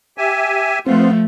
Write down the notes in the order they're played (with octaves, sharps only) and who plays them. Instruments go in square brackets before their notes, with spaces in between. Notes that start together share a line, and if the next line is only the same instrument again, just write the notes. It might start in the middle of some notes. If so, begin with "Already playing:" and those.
[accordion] G4 E5 G#5
[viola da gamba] F3 A3 [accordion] B3 F4 [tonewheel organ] C4